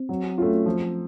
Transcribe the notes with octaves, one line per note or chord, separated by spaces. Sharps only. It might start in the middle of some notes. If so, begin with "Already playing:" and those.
Already playing: C4
F#3
A3 C#4 F4
F3